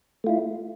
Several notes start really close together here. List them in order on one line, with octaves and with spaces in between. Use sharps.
A3 F4 E4